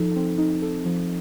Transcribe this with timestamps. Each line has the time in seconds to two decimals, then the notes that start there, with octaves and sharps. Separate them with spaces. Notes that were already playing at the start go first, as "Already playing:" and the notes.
Already playing: F3 D#4 A4
0.16 C4
0.38 D#4
0.62 A4
0.85 F3